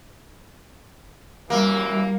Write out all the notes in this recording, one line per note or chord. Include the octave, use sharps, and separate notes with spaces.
C2 F#2 E3 G3 A#3